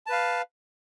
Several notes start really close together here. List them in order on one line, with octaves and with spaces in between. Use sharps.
A5 B4 F5